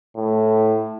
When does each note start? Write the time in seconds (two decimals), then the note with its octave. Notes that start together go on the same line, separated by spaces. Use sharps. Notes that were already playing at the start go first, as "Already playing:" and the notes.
0.16 A2